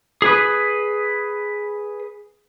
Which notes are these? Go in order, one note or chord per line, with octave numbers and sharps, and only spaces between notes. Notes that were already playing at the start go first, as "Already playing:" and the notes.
G#4 B4